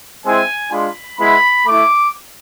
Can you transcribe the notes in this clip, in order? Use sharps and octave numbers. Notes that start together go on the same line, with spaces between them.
G#3 C4 E4 G#5
G#3 D4 F4 B5
G#3 B3 E4 B5
A3 E4 D6